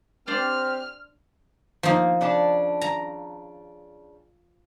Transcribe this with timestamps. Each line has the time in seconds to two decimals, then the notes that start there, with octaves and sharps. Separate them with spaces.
0.27 C4 D4 G4 C5 D5 F6
1.83 F3 A#3 D#4
2.21 C#3 D4 A5
2.81 A#5